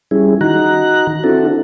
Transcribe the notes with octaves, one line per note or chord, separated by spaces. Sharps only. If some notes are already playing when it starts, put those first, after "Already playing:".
G3 C#4 E4 G#4
D#3 D#4 F#4 A#5 F#6
C4 D4 E4 F#4 A4